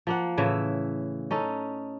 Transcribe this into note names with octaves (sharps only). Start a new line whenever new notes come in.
F3 A#3 F#5
A2 C#3 E3 E5
C#4 D#4 A4